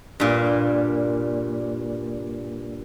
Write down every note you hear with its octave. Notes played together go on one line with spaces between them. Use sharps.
G2 A#2